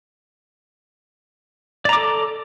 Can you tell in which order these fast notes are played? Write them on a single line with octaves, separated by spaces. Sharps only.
D5 A#5 D6 A4